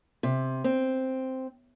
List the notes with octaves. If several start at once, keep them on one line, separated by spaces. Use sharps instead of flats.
C3
C4